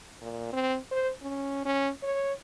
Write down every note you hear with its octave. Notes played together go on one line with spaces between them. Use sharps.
A#2
C4
C5
C#4
C#4
C#5